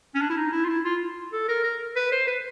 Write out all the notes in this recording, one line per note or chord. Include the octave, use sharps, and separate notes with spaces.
C#4
D4
E4
D#4
E4
F4
E4
F4
A4
A#4
A#4
B4
C5
B4